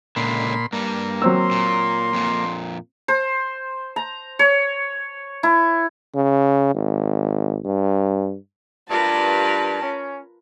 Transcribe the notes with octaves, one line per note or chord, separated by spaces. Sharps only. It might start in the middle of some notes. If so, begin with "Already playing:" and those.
C#2 A#2 D3 B5 C6
G2 G3 A#3
F#3 C4 C6 E6
A#2
F2 A#2
C5
A#5
C#5
E4
C#3
G#1
G2
G2 F4 A#4 B4 A5
C#4